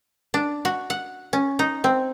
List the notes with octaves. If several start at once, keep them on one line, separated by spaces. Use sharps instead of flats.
D4
F#4
F#5
C#4
D#4
C4